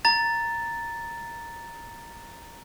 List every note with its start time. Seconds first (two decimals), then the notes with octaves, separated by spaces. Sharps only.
0.05 A#5 A6